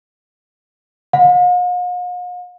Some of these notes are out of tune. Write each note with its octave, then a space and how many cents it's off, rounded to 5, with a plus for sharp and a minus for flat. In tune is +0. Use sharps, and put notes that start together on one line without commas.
F5 +45